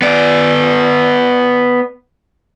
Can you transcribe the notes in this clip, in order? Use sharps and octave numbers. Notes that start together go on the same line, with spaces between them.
B3 D5